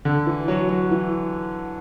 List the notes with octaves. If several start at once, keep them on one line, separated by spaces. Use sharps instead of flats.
D3
E3
F#3
F#3
E3